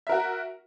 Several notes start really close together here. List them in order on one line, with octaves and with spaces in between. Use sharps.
E5 A#4 F#4